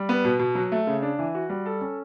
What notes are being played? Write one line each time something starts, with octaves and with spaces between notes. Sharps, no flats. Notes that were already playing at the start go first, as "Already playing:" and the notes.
Already playing: G3
B3
B2
B2
F#3
A3
C#3
D4
E3
F#4
G3
A4
C#4